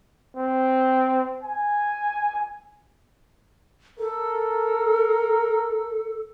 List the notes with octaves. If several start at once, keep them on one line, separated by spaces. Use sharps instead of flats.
C4
G#5
A4 A#4